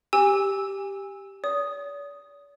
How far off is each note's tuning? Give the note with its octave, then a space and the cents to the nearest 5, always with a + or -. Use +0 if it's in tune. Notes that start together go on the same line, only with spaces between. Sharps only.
G4 +0 G#5 -25 E6 -10
D5 -45 D#6 +0